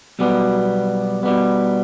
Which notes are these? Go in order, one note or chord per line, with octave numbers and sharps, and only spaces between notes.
B1 B2 G3 B3
B2 G3 B3